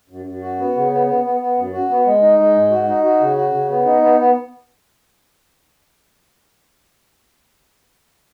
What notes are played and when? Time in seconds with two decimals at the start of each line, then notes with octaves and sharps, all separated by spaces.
0.09 F#2
0.26 F#2
0.42 F#4
0.58 B3
0.75 C#3
0.92 B3
1.07 B3
1.23 B3
1.40 B3
1.57 F#2
1.73 F#4
1.89 B3
2.06 G#3
2.22 D#4
2.38 G#3
2.55 G#2
2.70 F#4
2.88 D#4
3.03 F#4
3.20 C#3
3.36 F#4
3.53 C#3
3.69 B3
3.85 D#4
4.01 B3
4.18 B3